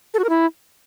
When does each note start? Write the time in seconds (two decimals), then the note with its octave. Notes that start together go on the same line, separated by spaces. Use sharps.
0.14 A4
0.19 F#4
0.24 A#4
0.29 E4